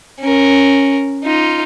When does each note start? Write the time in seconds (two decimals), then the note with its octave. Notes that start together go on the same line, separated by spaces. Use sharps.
0.20 C#4 A#4
1.24 D#4 F4